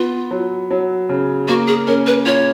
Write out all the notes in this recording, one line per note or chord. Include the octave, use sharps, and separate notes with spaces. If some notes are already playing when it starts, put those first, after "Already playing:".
Already playing: B3 F4
F#3
F#3
C#3
A#3 F#4
G#4
C#4 A#4
B4
F4 C#5